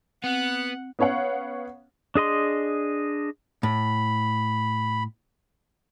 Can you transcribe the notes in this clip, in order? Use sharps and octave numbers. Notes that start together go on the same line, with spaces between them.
B3 C4 F#5
B3 C#4 C#5 F5 F#5
D4 G#4 D#5 C6
A2 B5